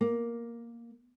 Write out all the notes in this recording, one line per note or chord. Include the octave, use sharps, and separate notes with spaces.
A#3